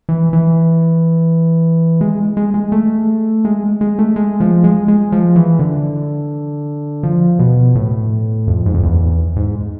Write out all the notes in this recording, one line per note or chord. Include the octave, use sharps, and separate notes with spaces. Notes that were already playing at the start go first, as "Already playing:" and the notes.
E3
E3
G#3
G#3
G#3
A3
G#3
G#3
A3
G#3
F3
G#3
G#3
F3
E3
D3
F3
B2
A2
F2
G#2
F2
E2
G#2